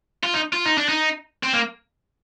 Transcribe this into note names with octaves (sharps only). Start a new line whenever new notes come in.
F4
D#4
F4
D#4
D4
D#4
C4
A#3